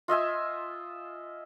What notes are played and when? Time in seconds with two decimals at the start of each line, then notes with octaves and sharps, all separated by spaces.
0.08 F4 D#5 E5 G#5